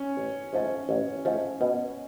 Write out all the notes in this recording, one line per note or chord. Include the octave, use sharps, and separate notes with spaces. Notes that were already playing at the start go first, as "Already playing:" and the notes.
Already playing: C#4
A1
G#2 F3 A3
A1
G#2 F3 A3
B2